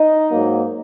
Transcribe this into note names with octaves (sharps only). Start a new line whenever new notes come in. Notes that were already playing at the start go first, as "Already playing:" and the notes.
Already playing: D#4 D#5
G#2 F#3 A#3